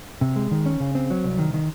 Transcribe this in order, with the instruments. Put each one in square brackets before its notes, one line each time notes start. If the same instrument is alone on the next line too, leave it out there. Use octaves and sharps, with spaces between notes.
[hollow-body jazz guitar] C3
G#3
D#3
C#4
C#3
C4
F#3
C2
D#3
D#3